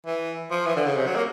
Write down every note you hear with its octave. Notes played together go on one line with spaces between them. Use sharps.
E3
F3
E3
D3
C#3
C3
F#3
A#3